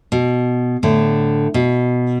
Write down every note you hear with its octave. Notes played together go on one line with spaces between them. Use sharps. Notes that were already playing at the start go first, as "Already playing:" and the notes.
B2
A2 D3
B2